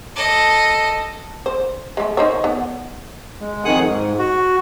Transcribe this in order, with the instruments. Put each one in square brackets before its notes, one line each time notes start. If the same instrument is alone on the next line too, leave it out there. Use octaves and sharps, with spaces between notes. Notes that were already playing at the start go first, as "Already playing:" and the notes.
[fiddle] A4 D#5
[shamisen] C5
G#3 A3
D#4 C5 C#5
B3
[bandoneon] G#3
F2 D#3 G#4 F#5 D#6 F#6
G#2
F#4